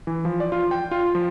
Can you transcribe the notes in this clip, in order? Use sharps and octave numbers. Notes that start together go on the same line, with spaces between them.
E3
F3
D5
F4
G5
F4
F3